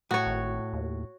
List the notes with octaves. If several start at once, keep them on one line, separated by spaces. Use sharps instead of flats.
A2 F#4 C#5
G#1
D#2